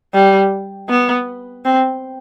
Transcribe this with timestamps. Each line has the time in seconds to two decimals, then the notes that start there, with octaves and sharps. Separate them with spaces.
0.14 G3
0.89 B3
1.65 C4